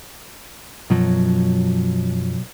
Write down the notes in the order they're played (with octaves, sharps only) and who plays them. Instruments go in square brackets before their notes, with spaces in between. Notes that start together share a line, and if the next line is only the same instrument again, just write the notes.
[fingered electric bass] F#2 F3 [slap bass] B2 F#3